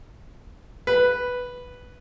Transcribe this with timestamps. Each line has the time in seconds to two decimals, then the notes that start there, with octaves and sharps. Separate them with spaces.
0.87 B4